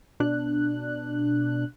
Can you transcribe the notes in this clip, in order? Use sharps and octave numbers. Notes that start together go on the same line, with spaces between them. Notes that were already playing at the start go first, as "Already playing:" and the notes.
B2 D4 F#6